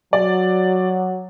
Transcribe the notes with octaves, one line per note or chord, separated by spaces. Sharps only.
F#3 D5